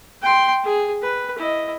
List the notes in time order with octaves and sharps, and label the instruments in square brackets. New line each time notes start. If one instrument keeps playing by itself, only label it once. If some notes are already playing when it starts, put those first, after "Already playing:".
[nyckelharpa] G5 C6
G#4
B4
E4 D#5